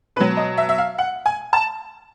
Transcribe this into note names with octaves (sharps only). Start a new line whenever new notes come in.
B2 F#3 B4
D#5
E5
E5
F5
F#5
G#5
A5